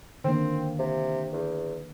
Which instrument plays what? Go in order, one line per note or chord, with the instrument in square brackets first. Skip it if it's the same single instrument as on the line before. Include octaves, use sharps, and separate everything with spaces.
[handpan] D3 D#3 A#3 [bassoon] C4
[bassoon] C3
E2